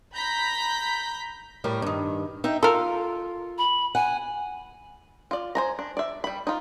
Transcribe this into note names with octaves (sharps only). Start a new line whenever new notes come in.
A#5 B5 G6 B6
A2 G3 A#4
G2 D#3
D#4 E5 G5
F4 A4 A#4
B5
F#5 G#5
F4 D5
C5 G#5 A#5
D4
D5 E5
G3 B5
D#4 F4